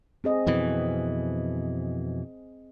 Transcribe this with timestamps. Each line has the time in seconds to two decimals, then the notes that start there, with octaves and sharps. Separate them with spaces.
0.24 C4 G#4 D#5
0.47 F2 B2 E3